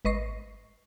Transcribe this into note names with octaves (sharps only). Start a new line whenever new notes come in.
G#1 B4 D#5 C#6 A#6 C7